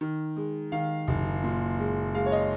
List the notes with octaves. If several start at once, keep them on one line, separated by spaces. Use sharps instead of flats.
D#3
G#3
D#3 F5
F#1
A#2
G#3
G#3 F5
C#5
D#5